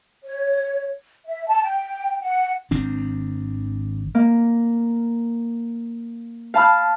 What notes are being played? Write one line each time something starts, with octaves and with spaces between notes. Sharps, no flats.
C#5
E5
A5
G5
F#5
G#1 D#3 C4 D4
A#3
F5 A5 B5 F6